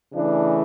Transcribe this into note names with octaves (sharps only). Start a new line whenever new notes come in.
C#3 E3 A3 D4